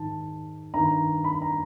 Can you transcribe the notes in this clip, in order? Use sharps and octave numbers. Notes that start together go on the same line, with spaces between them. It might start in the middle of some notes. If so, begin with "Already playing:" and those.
Already playing: G#2 D#3 A5
G2 D#3 A#5
B5
A#5